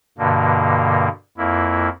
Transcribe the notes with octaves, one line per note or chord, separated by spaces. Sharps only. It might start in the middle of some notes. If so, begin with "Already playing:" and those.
G2 B2 D3 A#3
F2 A#3 E4